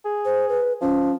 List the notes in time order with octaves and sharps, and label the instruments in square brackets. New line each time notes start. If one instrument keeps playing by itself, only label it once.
[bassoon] G#4
[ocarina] C5
B4
[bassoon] F3 [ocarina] C#4